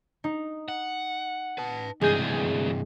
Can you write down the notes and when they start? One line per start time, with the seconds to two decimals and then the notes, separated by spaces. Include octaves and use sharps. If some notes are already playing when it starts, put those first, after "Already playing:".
0.24 D#4
0.68 F#5
1.58 B4 A5
2.01 D2 G2 C3 E3 G#3 G#4 G6 A#6